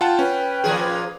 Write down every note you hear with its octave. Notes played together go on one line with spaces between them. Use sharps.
F4 F#5 G5 A5
C#4 B4
A#2 F3 G#4